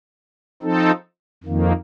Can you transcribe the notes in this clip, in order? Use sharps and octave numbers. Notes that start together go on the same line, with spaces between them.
F3 C4 D#4 A4
F2 D#3 A#3